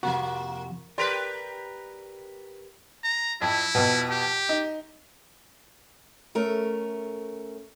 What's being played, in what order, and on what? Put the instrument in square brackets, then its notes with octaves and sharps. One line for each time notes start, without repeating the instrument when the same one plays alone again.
[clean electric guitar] F2 C3 F#4 [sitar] A#3
[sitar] G4 A#4 B4 [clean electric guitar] D5 C6
[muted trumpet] A#5
[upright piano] F2 [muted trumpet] E4
[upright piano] F2 B2
[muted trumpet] G4
[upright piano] D#4
[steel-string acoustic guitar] A3 C#4 A#4